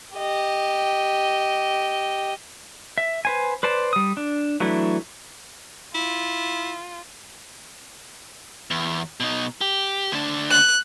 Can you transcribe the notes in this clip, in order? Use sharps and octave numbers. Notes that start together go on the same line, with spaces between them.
G4 D#5
E5
B4 C5 G#5
B4 C5 D5 A5
G3 D#6
D4
E3 F#3 A3 D4 E4
E4 F4
E2
B2 D#4
G4
D2 D4
F#6